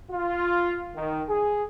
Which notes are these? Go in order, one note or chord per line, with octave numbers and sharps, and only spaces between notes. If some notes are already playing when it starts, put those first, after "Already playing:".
F4
D#3
G#4